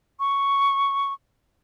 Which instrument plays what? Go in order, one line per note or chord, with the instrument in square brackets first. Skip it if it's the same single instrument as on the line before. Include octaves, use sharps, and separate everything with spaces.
[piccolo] C#6